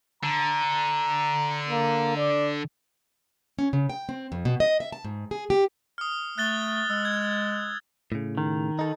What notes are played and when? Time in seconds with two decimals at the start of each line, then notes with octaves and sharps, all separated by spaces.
0.23 D3 A#5
1.68 A#3
2.17 D5
3.59 C#4
3.73 C#3
3.90 G5
4.09 C4
4.32 F2
4.45 B2
4.60 D#5
4.80 E5
4.92 A5
5.04 G#2
5.31 G#4
5.50 G4
5.98 D#6 F6
6.38 A3 F#6 A6 G7
6.90 G#3 E6
7.05 G#6
8.12 A2 C#3
8.37 D#3
8.79 D#4 A4